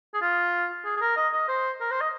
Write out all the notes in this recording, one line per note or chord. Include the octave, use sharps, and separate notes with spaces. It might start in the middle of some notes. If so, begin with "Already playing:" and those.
G#4
F4
G#4
G#4
A#4
D#5
D#5
C5
A#4
C5
D#5